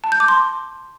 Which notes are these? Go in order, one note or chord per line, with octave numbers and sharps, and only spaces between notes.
A5
G6
D6
C6